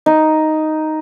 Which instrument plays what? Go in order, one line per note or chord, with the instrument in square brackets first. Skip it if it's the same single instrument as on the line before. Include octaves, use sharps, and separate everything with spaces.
[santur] D#4